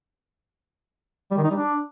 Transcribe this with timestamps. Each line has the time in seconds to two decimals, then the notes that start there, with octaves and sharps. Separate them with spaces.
1.31 G3
1.38 D#3
1.44 D#4
1.50 G3
1.57 D4